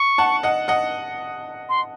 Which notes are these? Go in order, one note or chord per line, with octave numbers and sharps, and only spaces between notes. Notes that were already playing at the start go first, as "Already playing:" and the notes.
Already playing: C#6
F#5 A5
D#5 F#5
D#5 F#5
C6